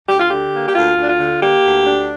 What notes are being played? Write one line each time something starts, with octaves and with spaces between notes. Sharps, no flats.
D2 G4
F4
D3 G4
A#3
G4
D2 F4
D2 D4
F4
D3
A#3 G4
D2
D4